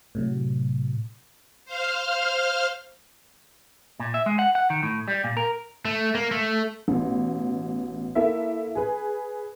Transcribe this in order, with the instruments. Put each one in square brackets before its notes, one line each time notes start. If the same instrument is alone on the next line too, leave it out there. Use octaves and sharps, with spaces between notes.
[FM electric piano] A2 C3 F#3
[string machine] C5 F5 F6
[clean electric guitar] A#2
E5
G#3
F#5
F#5
D#3
A2
G3
A#2
A#4
[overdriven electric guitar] A3
A#3
A3
[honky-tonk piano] A1 B2
A#3 E4 A4 E5
G#4 B4